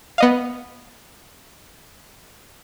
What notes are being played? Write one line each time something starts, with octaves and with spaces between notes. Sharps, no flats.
B3 D#5 F5